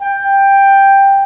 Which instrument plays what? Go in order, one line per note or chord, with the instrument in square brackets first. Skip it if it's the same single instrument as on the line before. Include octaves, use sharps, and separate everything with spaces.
[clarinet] G5